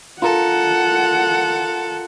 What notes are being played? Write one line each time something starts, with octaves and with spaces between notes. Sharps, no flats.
F4 A4 A#4 F#5